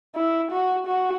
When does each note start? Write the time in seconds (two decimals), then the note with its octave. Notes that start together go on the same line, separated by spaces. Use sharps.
0.15 E4
0.51 F#4
0.87 F#4